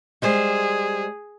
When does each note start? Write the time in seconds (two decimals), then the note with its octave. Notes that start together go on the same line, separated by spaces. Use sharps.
0.22 G3 G#3 G#4 C5